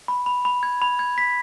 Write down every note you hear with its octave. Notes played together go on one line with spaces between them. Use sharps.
B5
B5
B5
G#6
B5
G#6
B6